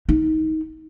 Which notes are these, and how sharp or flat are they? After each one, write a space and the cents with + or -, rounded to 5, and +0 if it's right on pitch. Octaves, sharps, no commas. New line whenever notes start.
D#4 +20